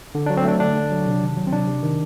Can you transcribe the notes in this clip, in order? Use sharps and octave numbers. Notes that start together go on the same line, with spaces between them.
D3
D4
F#3
C4
A3 D4
D3 D4
D3
F#3
C3
D#3
F#3
C4
C3 D4
C3
D#3